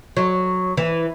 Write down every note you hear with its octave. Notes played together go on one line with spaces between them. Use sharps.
F#3
E3